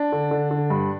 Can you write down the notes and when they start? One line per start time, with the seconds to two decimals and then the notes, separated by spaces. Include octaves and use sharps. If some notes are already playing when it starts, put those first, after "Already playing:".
Already playing: D4
0.12 D3
0.31 D3
0.51 D3
0.70 G2